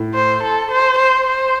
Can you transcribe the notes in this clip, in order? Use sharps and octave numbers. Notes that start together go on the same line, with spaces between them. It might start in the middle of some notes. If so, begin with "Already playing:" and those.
Already playing: A2
C5
A4
C5
C5
C5